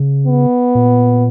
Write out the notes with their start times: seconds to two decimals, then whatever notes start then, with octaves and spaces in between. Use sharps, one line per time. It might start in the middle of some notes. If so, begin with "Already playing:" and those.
Already playing: C#3
0.27 B3
0.75 A#2